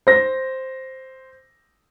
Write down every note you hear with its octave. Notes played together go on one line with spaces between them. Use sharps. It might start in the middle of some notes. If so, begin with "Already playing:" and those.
C5 A#6